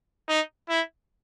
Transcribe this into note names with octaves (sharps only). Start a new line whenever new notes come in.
D#4
E4